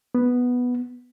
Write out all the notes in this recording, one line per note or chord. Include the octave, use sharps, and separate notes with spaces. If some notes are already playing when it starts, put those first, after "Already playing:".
B3